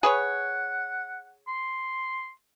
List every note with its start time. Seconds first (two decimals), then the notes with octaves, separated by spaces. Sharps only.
0.03 G#4 B4 C#5 F#5
1.48 C6